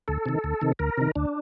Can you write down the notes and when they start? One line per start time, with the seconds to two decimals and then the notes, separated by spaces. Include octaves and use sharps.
0.08 D2 A4
0.26 C3 D#3
0.44 D2
0.61 C3 D#3
0.79 D2 A#4
0.98 C3 D#3
1.15 D2 D4